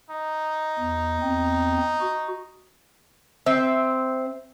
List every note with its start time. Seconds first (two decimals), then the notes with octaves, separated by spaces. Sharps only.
0.10 D#4
0.79 E2
1.22 E2 C4
2.00 F#4
3.46 C4 E5